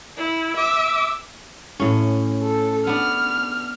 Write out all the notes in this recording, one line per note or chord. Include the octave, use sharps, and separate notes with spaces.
E4
E5 D6
A2 C#4
A4
B3 D4 F6